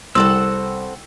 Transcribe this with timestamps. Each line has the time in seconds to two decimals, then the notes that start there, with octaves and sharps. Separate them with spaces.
0.15 C2 C4 A4 F#5 E6